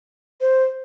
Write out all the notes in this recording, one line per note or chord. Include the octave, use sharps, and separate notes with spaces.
C5